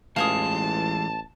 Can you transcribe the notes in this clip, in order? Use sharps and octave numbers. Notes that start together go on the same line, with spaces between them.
A1 E3 G#3 F4 F5 G#5 A5 D#6